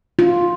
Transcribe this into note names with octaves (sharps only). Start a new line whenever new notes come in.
F4